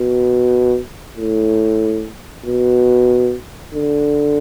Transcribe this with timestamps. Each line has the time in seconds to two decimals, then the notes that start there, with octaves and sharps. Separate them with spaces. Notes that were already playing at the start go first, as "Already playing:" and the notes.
Already playing: B2
1.17 A2
2.46 B2
3.74 D3